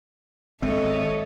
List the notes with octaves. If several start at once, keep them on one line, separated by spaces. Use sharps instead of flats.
G#1 G#3 C4 A4 C#5 D#5 E5